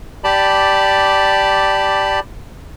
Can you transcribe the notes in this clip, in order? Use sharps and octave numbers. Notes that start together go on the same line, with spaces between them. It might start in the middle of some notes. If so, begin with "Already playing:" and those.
G4 D5 A5 B5